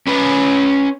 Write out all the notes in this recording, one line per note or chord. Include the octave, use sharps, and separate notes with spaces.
C#4 B4